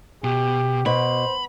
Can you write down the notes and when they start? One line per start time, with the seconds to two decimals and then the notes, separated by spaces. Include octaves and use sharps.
0.24 B2 G4
0.86 B2 C5 B5